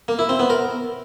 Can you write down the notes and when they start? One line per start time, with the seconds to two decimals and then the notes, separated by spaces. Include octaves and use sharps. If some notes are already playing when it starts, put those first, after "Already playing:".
0.08 A#3
0.19 E4
0.29 C4
0.39 B3
0.50 A#4